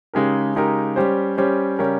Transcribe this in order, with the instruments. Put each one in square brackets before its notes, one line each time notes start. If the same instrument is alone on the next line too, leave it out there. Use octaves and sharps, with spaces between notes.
[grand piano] C#3 G#3 D#4 G4 A#4
C#3 G#3 D#4 G4 A#4
G3 C#4 G4 C5
G3 C#4 G4 C5
C#3 G3 C#4 G4 A#4